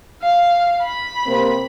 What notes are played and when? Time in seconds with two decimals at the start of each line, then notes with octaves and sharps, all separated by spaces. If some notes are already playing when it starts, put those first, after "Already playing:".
0.22 F5
0.83 B5
1.26 C3 A#3 C4